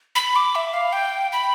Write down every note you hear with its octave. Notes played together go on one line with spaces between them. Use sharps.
B5
D6
E5
F5
G5
B5